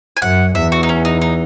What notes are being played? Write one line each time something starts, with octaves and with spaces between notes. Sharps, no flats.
G#5
F#2 F#5
E2 E5
F#4
D#4
C#4
D#4
D#4